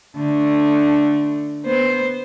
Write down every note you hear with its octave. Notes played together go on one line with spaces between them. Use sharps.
D3 A3
B3 C5